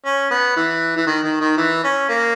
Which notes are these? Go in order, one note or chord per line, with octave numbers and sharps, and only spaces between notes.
C#4
B3
E3
E3
D#3
D#3
D#3
E3
C#4
A#3